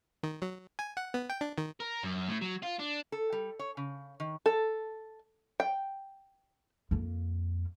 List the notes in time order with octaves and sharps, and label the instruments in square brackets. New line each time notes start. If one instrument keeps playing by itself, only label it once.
[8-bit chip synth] D#3
F#3
G#5
F#5
B3
G5
D4
D#3
[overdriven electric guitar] A#4
F#2
A2
F#3
F4
D4
[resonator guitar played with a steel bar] A4
G3
C#5
C#3
D#3
[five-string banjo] A4
G5
[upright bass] F2 A#3